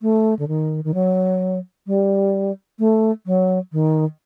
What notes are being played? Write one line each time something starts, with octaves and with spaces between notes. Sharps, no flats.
A3
D3
D#3
D#3
F#3
G3
A3
F#3
D#3